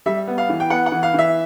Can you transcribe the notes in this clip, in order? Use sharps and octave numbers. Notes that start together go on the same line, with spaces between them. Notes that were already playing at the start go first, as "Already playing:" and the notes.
G3 E5
B3
F5
E3
G5
B3 F#5
F#5
E3
F5
E3 E5